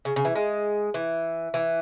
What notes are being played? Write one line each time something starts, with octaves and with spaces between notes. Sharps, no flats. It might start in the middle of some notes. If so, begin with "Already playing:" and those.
C#3
C#3
E3
G#3
E3
E3